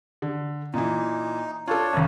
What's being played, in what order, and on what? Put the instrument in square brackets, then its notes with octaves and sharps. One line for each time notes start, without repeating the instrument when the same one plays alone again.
[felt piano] D3
[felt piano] A#2 E3 [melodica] D#4
[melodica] D4 C#5 [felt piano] F4 A4
[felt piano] G#1 F#2